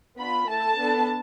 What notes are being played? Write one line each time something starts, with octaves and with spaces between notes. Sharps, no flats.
B3 D4 F4 B5
A3 E4 A4 A5
B3 D4 A4